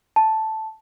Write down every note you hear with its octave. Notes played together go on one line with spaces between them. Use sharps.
A5